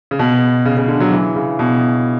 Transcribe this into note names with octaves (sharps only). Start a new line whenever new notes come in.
C#3
B2
C#3
C#3
D3
F#3
E3
C#3
B2